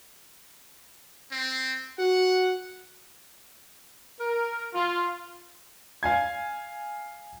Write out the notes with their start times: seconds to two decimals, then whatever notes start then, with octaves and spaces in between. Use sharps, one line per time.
1.31 C4
1.99 F#4 F#5
4.19 A#4
4.74 F4
6.03 F5 G#5 G#6